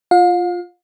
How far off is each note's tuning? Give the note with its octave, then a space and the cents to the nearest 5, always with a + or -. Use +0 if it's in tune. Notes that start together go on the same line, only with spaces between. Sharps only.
F4 +0 F5 +40